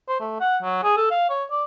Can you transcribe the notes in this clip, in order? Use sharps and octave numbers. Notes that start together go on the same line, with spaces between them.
C5
A3
F#5
F#3
G#4
A4
F5
C#5
D5